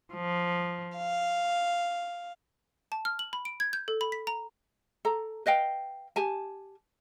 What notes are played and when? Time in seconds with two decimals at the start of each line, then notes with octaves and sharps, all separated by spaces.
0.13 F3
0.96 F5
2.92 A5
3.05 F6
3.19 F#7
3.33 B5
3.45 D7
3.60 G#6
3.73 G6
3.88 A4
4.01 B5
4.12 B6
4.27 A#5
5.05 A4 A#5
5.46 B4 D#5 F5 G5
6.16 G4 G#5 A5